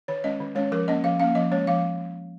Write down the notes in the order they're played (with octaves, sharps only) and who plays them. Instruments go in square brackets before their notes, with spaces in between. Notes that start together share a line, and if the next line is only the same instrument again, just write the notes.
[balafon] D#3 C#5
G#3 C#4 D#5
D#3
G#3 C#4 C#5
F3 A#4
A#3 C#4 D#5
F3 F5
A#3 C#4 F5
F3 D#5
G#3 C#4 C#5
F3 F5